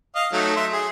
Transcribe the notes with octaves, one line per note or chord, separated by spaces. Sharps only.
D#5 F5
F#3 A3 D#4
E5 C6
G#4